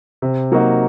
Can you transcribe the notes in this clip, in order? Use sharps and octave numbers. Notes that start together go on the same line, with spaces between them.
C3
F#3 A#3 D#4 F#4